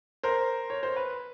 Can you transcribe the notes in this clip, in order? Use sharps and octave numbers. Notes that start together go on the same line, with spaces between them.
A#4 C5
C#5
C5
B4